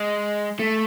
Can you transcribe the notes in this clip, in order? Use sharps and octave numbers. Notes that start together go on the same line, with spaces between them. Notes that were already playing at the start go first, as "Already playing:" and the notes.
Already playing: G#3
A3